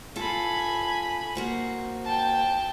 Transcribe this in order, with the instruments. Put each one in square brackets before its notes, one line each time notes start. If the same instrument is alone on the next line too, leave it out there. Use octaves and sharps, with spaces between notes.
[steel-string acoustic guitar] F4 A4 [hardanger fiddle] G#5 B5
[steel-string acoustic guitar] A#3 F#4 C5
[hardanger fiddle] G5 A5